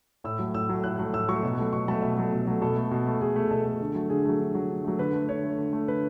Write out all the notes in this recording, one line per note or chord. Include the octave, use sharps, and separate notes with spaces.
A2 E6
F#3 A3
A2 E6
F#3 A3
A2 F#6
F#3 A3
A2 E6
F#3 A3 C#6
B2
F#3 A3
B2 C#6
F#3 A3 A5
B2 E5
F#3 A3
B2
F#3 A3
B2 A4
A3
B2
A3
B2 G#4
A3
B2 A4
A3
D3
F#3 A3
D3 G#4
F#3 A3
D3
F#3 A3
D3
F#3 A3
D3 B4
A3
D3 C#5
A3
D3
A3
D3 B4